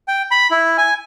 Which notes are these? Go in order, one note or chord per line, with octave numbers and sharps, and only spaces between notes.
G5
B5
E4
G#5